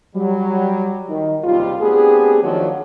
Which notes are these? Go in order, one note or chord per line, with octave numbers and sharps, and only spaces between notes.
F#3 G3
D#3
F#1 D#2 C3 G3 F4
A3 B3 C4 D4 G4 G#4
D#3 F3 F#3 D4